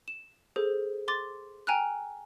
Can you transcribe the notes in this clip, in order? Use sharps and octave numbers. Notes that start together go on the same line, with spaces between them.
E7
G#4 A4 C5
C6 D6 A6
G5 G#5 A#5 F6 F#6